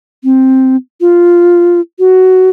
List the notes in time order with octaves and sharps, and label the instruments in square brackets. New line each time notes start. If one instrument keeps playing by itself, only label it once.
[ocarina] C4
F4
F#4